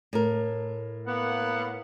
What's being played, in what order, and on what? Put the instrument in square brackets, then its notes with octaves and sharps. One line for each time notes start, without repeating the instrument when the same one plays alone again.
[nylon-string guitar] A2 A#4
[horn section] A#3 B3 F#5